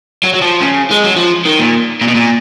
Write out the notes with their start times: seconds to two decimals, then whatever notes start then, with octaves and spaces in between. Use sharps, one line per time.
0.24 F#3
0.34 F#3
0.42 F3
0.62 C#3
0.91 G#3
1.04 F#3
1.17 F3
1.46 D#3
1.59 A#2
2.01 A#2
2.08 B2
2.15 A#2